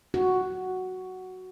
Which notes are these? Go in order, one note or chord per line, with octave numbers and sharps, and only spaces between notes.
F#4